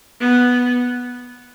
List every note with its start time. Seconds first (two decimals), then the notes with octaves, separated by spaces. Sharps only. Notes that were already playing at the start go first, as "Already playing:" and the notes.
0.20 B3